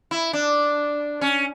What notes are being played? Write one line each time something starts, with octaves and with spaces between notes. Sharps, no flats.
E4
D4
C#4